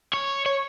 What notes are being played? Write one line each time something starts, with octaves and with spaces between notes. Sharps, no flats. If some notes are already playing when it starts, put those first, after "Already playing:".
C#5
C#5